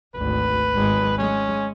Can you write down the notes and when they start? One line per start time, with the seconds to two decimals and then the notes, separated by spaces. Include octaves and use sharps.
0.15 G#1 D2 B4
0.74 G#1 G#3
1.18 G#3 C#4